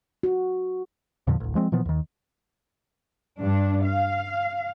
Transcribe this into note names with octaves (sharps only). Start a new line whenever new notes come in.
F#4
E2 A#2 D3 F3
D1 A1
F3 G#3 C4
A#2 E3 F3 B3
D#2 D#3
G2 D4
F5